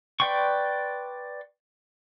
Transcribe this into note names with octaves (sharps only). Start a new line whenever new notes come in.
B4 D5 G5 C6 C#6